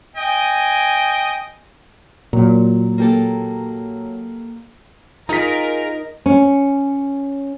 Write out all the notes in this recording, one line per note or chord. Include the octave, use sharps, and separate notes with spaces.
D#5 G5 G#5
A#2 F#3
A#3 G4 A4
D#4 F4 G#4 A#4 A#5 B6
C#4